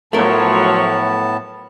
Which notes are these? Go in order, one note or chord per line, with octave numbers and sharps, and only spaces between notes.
A2 F3 F#3 A3 B3 A#4 C#5 A5